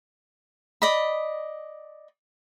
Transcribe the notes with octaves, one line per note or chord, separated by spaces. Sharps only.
D5 D#5 B5